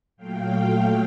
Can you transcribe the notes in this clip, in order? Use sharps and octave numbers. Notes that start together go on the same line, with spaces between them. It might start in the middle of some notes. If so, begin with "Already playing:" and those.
A#2 F#3 A3 F5 G5